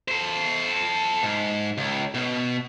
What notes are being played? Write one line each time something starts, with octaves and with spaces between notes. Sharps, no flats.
A4 C5
G#2
C#2
B2